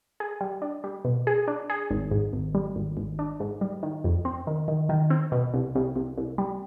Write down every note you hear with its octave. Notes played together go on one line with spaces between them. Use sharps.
G#4
G3
D4
G3
B2
G#4
D4
G#4
G#1
G#2
G#1
G3
G#1
G#1
D4
G#2
G3
D#3
F2
C4
D#3
D#3
D#3
C4
B2
C2
C2
C2
C2
G3